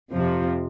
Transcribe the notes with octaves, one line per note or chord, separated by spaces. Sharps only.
F2 C3 F3